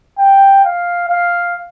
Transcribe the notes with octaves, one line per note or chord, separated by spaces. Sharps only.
G5
F5
F5